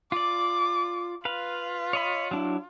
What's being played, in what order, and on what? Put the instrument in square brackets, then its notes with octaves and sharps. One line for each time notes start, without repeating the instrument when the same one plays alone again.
[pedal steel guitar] F4 D5 [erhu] D6
[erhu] F4 [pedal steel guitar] B4 F5
[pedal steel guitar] C#5 D#5 B5
F#3 D4 E4